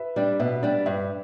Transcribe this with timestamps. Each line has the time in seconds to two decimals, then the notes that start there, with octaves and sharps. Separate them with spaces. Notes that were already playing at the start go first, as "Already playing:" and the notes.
Already playing: B4 E5
0.16 G3 D4
0.40 B2 B4 E5
0.63 G3 D4
0.86 G2 B4 E5